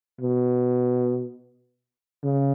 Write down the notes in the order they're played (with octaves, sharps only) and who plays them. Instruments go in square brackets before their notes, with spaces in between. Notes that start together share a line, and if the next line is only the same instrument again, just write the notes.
[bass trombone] B2
C#3